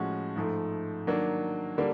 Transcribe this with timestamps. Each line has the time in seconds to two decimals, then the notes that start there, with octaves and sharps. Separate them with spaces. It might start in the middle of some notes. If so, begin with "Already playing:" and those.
Already playing: A2 F3 G#3 C#4 F#4
0.36 G#2 F3 A3
1.07 D#3 F#3 A#3 D4
1.78 D3 G3 A#3